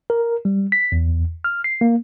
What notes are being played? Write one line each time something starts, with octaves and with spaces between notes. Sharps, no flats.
A#4
G3
B6
E2
F6
C7
A#3